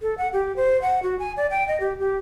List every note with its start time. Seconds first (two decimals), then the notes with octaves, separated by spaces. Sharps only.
0.02 A4
0.18 F#5
0.33 G4
0.56 C5
0.82 F#5
1.03 F#4
1.19 G#5
1.37 D5
1.50 G5
1.68 D#5
1.80 G4
1.99 G4